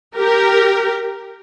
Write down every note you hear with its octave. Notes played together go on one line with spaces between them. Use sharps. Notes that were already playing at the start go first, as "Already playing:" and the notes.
G4 A#4